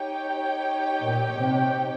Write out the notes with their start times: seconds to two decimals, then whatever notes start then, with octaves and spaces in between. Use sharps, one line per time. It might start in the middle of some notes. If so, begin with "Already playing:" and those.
Already playing: D#4 G4 C#5 G5
1.05 A#2
1.39 C3